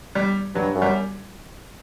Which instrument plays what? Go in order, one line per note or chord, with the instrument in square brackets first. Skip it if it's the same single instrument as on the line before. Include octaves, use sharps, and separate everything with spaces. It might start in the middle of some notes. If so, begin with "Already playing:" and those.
[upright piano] G3
[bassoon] G2 [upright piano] F#3
[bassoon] F#2
[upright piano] G3